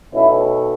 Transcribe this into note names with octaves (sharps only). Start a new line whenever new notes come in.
B1 B2 A3 C#4 E4